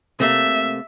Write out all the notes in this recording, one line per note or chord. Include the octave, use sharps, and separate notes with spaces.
C3 A3 A#3 E5